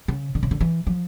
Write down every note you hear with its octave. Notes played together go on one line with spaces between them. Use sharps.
C#3
D3
C#3
D3
E3
F3